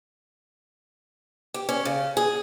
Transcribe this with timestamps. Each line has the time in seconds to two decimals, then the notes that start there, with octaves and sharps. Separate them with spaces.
1.54 G4
1.69 C#4
1.85 C#3
2.17 G#4